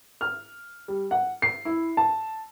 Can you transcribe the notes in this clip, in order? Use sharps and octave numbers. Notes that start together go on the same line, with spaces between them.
F6
G3
F#5
C7
E4
A5